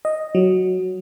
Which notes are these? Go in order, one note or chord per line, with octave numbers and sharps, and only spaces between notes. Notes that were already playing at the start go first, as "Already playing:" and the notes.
D#5
F#3